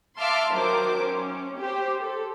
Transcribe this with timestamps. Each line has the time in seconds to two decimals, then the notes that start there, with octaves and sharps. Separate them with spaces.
0.19 E5 F5 A5 C6 D6 F6
0.51 D#3 F#3 C5 D6
1.00 C#4
1.59 G4 C5
2.02 A4